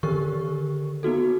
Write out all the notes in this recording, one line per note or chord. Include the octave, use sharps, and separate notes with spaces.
D3 D#3 G4 A#4 C#6
B3 D#4 F#4 A4